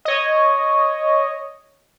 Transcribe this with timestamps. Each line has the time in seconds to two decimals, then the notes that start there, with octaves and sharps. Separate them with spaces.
0.05 C#5 D#5